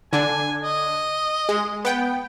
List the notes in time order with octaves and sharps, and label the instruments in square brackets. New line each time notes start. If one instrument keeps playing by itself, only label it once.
[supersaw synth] D3 D4 [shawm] G#5
[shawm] D#5
[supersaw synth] G#3
B3 G5